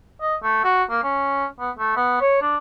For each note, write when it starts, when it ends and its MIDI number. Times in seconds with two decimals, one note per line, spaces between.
0.21 0.35 75
0.43 0.60 57
0.65 0.83 66
0.90 1.03 58
1.04 1.46 61
1.60 1.71 59
1.78 1.93 57
1.96 2.17 59
2.21 2.40 73
2.42 2.57 62